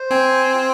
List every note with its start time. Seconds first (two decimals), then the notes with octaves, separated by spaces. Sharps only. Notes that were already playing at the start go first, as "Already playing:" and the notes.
Already playing: C5
0.11 C4 G#5
0.54 F4